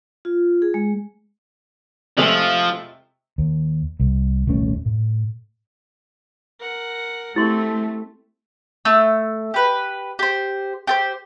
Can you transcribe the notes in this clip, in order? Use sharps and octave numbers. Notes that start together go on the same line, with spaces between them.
F4
G#4
G#3
C3 F3 G#3 A3
D#2
C2
D#1 C2 A3 C#4
A2
A#4 F#5
A3 C4 E4 G4 C6
A3 E6
G4 B4
G4 C5
G4 A4 C5